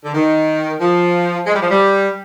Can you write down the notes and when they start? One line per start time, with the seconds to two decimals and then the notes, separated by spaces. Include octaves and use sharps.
0.05 D3
0.14 D#3
0.81 F3
1.47 G#3
1.54 G3
1.62 F3
1.71 G3